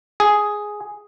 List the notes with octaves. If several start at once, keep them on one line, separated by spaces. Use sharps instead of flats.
G#4